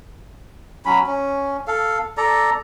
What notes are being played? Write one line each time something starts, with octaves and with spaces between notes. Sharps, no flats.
F#3 C#4 B5
C#4
A4 F5
A4 D5 A#5